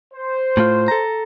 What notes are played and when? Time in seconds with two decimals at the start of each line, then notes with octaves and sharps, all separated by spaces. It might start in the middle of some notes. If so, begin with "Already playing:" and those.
0.14 C5
0.57 A2 A3 F4
0.88 A4 A#5